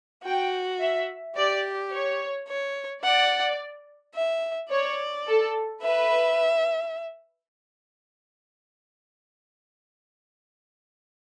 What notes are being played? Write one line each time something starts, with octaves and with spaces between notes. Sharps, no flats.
F#4 G5
E5
G4 D5
C#5
C#5
D5 F#5
E5
C#5 D5
A4
B4 E5